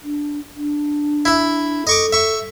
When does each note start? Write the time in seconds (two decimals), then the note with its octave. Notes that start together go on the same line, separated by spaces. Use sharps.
0.04 D4
0.57 D4
1.25 E4 E5
1.87 A4 D#5 C#6 D6
2.13 E5 C#6